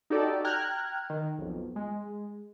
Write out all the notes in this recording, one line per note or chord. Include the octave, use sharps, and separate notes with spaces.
D#4 F#4 G4 A4 D5
G5 A#5 F6 F#6 G#6
D#3
B1 F2
G#3